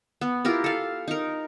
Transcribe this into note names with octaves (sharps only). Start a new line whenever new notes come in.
B3
E4 F4 G4 A#4
A4 F5
D#4 A#4